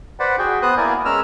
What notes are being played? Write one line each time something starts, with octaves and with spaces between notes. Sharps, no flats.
B4 C5 D5 F#5
F#4 G#4 G5
B3 C5 D#6 F#6
A#3 B3 E4 A#4 D5 G#5
G#3 C#4 A#4 E6 F6